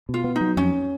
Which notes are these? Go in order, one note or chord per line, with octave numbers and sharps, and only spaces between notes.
B2
F4
B3
F#3 D#4
F2 C#4